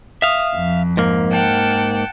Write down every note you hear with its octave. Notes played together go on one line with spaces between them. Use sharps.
E5 F5 D#6
F2
G#2 A#3
F#5 G5 A5